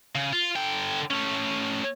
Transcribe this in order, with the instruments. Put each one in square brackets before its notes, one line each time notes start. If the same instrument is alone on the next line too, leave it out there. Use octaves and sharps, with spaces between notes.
[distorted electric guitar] C#3
F4
D3 G5
A3 C#4